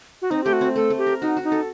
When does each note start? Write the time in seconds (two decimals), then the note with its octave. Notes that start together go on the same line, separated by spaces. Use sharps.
0.22 F#4
0.31 C4 D#4
0.44 A3 G4
0.53 F#4
0.61 C4
0.76 A3 A4
0.90 A3
0.98 G4
1.06 A#4
1.22 D#4 F#4
1.37 F#4
1.44 D#4
1.52 A4